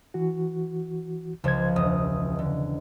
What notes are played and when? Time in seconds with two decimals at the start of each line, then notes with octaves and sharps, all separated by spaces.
0.14 E3 F#4
1.44 C#2 C#3 F3 C5 G#6
1.76 E1 D#5 D#6
2.39 D3